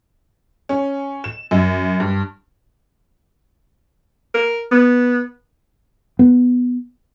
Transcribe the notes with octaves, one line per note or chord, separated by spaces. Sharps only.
C#4
E7
F#2
G2
A#4
B3
B3